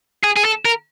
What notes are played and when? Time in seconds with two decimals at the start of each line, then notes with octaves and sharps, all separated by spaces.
0.24 G#4
0.37 G#4
0.45 A4
0.65 A#4